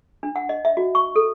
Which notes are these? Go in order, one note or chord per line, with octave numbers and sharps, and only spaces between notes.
D4
F#5
D#5
E5
F#4
C#6
A4